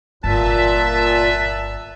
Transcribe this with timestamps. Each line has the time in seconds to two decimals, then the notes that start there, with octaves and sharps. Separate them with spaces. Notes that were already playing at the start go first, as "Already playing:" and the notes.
0.24 G1 A#2 B4 E5 A5